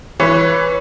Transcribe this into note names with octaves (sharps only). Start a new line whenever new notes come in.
E3 B4 C#5